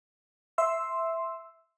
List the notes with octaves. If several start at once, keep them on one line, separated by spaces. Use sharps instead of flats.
E5 C6 E6